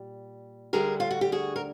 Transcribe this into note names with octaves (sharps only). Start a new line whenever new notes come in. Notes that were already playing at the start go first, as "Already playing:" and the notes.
Already playing: A#2 G3
D2 D3 G3 G#4 A#4
F4
F#4
G4
F#4 G#4
A#4